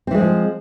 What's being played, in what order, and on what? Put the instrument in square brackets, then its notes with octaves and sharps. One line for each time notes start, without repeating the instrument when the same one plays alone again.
[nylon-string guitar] C4
E3
G#3
F3